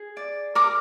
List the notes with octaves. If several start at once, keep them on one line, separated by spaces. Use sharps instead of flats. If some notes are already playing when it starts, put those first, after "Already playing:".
Already playing: G#4
D5
A#4 D6